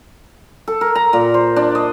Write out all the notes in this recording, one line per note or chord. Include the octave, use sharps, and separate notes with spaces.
A4
A#4
A#5
A#2
C5
D4
D#5